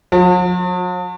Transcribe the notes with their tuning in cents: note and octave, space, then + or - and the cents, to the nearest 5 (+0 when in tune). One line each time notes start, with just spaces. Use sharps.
F#3 -45